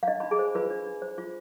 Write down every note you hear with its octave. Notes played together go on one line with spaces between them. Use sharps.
F5
D4 D#5
D4 B5
G#4 G#5
C5
F4 B4 B5
D4
D4
C5
F4